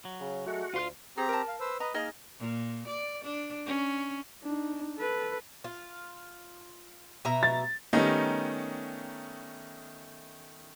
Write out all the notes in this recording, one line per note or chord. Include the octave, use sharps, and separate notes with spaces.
F#3
C#3
G#3 A3 F#4
D2 F4 C6
C4 G4 G#4 A#5
A#4 A5
F5
B4 C5 E6
B4 D#5 A#5
A#3 D#4 G#4 A#4 D#5 F6
A#2
D5
D4
C#4
D4 D#4
A4 B4
F4
B2 E5 A#5
A6
D#3 G3 A3 B3 C#4 D#4